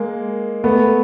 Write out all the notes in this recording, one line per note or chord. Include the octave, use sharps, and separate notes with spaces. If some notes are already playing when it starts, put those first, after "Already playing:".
Already playing: G#3 A#3
A3 B3